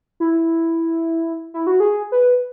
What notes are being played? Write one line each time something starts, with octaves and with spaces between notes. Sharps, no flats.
E4
E4
F#4
G#4
B4